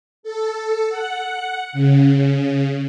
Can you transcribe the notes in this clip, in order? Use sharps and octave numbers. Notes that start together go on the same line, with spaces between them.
A4
F#5
C#3